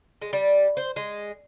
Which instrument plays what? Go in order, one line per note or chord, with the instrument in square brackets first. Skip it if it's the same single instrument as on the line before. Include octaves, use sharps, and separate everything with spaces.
[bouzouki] G#3
G3
C5
G#3